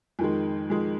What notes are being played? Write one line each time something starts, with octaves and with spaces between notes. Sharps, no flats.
F2 D#3 G#3
F2 D#3 G#3